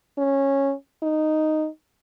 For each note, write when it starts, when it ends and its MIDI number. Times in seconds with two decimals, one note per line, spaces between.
0.18 0.73 61
1.03 1.68 63